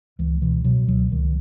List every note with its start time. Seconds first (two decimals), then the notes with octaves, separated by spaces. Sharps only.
0.19 C#2 E3
0.42 B2 E3
0.64 B2 F#3
0.88 C#2 F#3
1.11 C#2 D#3